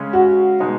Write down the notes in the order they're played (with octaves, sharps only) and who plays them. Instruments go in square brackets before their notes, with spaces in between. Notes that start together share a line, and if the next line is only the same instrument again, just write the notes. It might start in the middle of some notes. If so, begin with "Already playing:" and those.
Already playing: [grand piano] C#3 G#3 C#4
[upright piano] F#4
[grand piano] B2 G#3 D#4